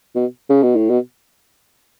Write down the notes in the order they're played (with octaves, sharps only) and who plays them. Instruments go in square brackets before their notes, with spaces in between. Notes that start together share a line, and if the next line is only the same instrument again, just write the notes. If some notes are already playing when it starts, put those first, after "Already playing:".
[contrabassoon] B2
C#3
B2
A2
B2